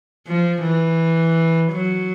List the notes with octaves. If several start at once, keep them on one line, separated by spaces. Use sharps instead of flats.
F3
E3
F#3